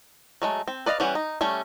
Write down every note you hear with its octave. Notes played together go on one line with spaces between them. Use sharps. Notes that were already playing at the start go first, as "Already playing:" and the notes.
F#3 G#3 A3
C4
B4 D5 D#5 F5
E3 G3 C#4 G4 F#5
D#4
G3 A3 C#4